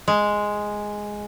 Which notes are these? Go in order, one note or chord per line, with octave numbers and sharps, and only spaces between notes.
G#3